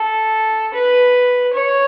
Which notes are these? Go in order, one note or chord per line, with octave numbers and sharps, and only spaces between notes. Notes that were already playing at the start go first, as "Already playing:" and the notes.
Already playing: A4
B4
C#5